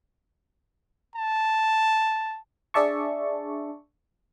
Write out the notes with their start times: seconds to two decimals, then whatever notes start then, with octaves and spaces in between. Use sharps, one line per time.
1.16 A5
2.74 D4 G#4 D5 E5 A5 C#6